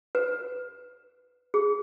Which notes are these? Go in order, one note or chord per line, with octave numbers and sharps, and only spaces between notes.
B4
G#4